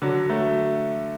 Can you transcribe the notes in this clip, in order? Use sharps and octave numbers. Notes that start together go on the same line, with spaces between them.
D3 F#3
F#3 A3